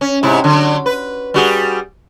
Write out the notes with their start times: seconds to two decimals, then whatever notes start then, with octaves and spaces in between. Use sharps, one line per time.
0.01 C#4
0.23 G#2 C3 E4
0.44 D3 F#3
0.86 B4
1.34 G3 F#4 G#4